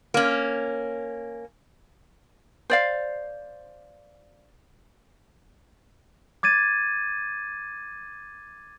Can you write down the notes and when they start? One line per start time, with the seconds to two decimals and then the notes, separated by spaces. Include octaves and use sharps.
0.14 A#3 C#4
2.70 C5 D5 F5
6.43 D6 G#6 A6 D#7